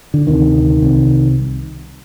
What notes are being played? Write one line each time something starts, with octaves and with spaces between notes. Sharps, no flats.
D3
D2 C3 D#3
C2 C3